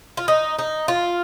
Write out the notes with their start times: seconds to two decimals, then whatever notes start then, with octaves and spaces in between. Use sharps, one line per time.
0.17 F4
0.28 D#4
0.59 D#4
0.88 F4